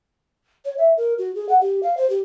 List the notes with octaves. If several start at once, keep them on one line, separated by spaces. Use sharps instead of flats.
C#5
E5
A#4
F#4
G#4
F#5
G4
F5
C5
G4